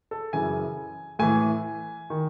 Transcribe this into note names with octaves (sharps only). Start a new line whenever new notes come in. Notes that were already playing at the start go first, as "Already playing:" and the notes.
A4
F#2 C#3 E3 G#5
A2 E3 G#5
D#3